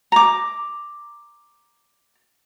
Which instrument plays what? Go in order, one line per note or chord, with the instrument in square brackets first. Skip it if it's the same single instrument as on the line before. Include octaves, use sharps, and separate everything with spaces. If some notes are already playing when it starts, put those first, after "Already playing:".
[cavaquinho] A#5 D6